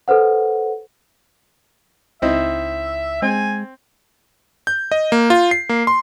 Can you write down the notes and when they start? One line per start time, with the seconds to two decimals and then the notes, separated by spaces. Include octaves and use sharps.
0.08 A4 B4 C5 F#5
2.22 C#2 C4 D#4 E4 E5
3.22 G#3 C4 G#5
4.67 G6
4.92 D#5
5.12 A#3
5.30 F4
5.51 C7
5.69 A#3
5.87 C6